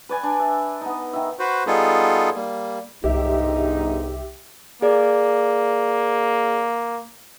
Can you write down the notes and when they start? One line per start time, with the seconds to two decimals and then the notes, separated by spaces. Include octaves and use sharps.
0.09 B4 D5 G#5
0.23 D4
0.40 E5
0.81 B3 D#4
1.13 D#3 E5
1.39 F#4 B4 C5
1.67 G3 B3 D#4 F4 G#4 A4
2.35 G3 A#3
3.04 G1 C2 G#2 D#4 G4 E5
4.82 A#3 G#4 D5